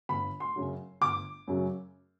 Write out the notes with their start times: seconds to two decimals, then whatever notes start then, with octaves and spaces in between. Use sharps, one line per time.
0.09 G1 B5
0.40 C6
0.56 F#2 C#3 F#3
1.01 G1 D6
1.48 F#2 C#3 F#3